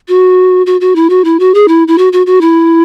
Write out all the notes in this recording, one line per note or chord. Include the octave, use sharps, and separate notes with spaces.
F#4
F#4
F#4
E4
F#4
E4
F#4
G#4
E4
E4
F#4
F#4
F#4
E4